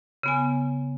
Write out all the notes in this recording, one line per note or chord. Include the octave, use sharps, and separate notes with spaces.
C#3 B3 G#5